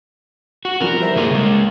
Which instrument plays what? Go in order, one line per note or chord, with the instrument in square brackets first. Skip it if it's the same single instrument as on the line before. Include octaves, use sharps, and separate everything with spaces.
[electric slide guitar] F#4
[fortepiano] E3 F3 G3 [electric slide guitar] A#4
[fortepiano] C5 E5 A#5
[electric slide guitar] D3 G3 G#4 [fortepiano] A#3
[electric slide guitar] C#3 G#3